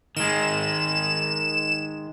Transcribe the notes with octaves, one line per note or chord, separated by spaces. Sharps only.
D#3 G#3 E7